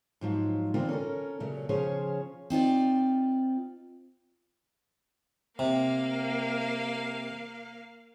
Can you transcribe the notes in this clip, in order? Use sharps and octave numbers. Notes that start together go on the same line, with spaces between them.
G#2 F3 F#3 F4
D3 E3 A#3 C4 D4 F4
C#4 A4 A#4
A#2 C#3 F#3 A3
C#3 F3 C#4 G#4 C5 C#5
C4 D#4 F4 D5
C3 A#3 F5